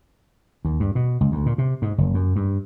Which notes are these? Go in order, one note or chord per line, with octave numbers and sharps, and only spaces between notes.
D#2
G2
B2
C#2
D2
A#2
C3
G#2
F#1
F#2
G2